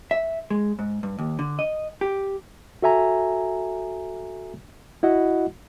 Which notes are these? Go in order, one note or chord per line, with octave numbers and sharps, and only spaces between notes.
E5
G#3
G#2
G2
D#2
D3
D#5
G4
F#4 A4 E5 G#5 A#5
E4 F#4 D#5 F#5